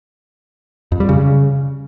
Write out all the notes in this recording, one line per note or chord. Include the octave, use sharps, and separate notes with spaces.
F2
G3
C#3